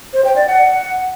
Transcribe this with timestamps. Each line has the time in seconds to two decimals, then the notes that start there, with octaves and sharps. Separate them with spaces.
0.13 C5
0.25 G5
0.36 D5
0.47 F#5